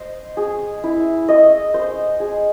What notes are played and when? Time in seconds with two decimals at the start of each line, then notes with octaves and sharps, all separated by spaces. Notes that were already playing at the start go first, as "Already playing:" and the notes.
Already playing: C5 D#5
0.37 G#4
0.84 E4
1.28 D#5
1.74 C5
2.20 G#4